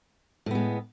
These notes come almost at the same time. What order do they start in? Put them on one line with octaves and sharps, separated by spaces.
A2 B3 G#3